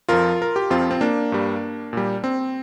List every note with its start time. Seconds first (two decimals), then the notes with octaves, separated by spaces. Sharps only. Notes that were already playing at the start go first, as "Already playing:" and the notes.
0.09 F2 F3 F4 A#4
0.42 A#4
0.56 G4
0.70 F2 F3 C4 F4
0.91 C4
1.01 A#3 D4
1.32 G2 G3
1.93 A#2 G3
2.24 C4